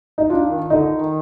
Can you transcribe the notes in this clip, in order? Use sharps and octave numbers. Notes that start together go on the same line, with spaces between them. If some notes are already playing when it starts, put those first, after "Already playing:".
D#4
D4 F4
D#3
D3 D#4
D#3